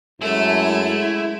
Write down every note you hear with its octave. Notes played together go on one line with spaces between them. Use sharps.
F#2 G#3 A3 E4 A4